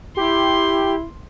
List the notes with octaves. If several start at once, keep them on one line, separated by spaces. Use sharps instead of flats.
E4 G4 C6